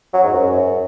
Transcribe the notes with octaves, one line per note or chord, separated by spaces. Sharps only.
F#3
G#2
F#2